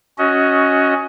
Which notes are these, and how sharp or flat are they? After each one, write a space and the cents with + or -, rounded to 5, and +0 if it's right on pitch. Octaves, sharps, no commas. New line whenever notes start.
C#4 +5 F#4 +0 D#5 +20